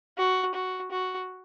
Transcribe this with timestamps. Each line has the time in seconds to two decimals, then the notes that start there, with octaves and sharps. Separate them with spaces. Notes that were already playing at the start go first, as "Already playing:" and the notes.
0.18 F#4
0.54 F#4
0.91 F#4